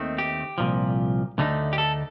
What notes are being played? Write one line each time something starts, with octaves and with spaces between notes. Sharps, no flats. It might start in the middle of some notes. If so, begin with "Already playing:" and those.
Already playing: D#2 D#3 A3 C4
G4
C2 A#2 F3
D2 D3 A3 D#4
G4
A4